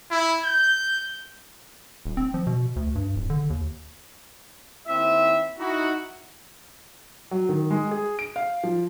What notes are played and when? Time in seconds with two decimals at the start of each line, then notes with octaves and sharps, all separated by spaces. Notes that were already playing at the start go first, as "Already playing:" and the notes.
0.11 E4
0.43 G6
2.05 D#1
2.17 C4
2.34 F3
2.47 B2
2.76 D2
2.95 G2
3.16 D1
3.30 D3
3.50 D#2
4.88 D#2 C4 E4 E5
5.59 D#4 E4 F#4
7.31 F#3
7.49 D#3
7.70 G#3
7.91 G#4
8.19 D7
8.36 F5
8.64 F3